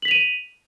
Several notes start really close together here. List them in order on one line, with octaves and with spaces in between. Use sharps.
F#7 B6 F7 D#7